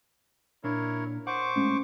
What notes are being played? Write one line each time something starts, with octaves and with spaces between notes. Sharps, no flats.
A#2 D4 E4 A#4 C#5
C5 F#5 C#6 D6
A2 G#3 C#4